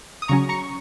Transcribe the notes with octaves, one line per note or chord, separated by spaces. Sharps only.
D#6
C#3 F#3 C#4 A#5 C#6
A#5 C#6